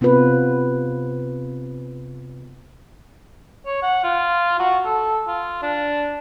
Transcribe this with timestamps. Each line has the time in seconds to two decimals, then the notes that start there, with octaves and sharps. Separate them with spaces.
0.01 C3 B3 C4 F4 B4
3.66 C#5
3.82 F#5
4.03 F4
4.59 F#4
4.85 A4
5.27 F4
5.62 D4